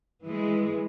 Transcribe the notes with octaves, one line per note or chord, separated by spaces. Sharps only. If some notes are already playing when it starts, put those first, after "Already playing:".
E3 G#3